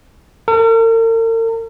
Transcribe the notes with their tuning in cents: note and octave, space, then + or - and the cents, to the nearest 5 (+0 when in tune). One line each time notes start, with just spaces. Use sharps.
A#4 -45